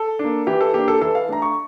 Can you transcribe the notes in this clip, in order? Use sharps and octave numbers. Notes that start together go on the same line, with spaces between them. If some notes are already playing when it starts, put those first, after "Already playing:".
Already playing: A4
A#3 D4
E3 G4
A4
A#3 D4 G4
A4
E3 A4
F5
A3 D4 A#5
C#6